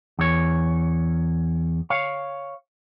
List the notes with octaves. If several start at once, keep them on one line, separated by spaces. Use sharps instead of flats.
E2 C#5
C#5 F5